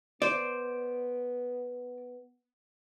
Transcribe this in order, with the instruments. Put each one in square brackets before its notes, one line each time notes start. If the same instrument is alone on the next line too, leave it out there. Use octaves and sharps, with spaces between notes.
[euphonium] B3 [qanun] C5 [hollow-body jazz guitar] D5